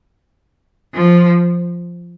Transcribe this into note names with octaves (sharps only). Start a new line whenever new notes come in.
F3